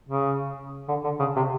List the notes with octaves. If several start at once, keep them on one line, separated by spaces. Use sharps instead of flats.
C#3
D3
D3
C#3
C3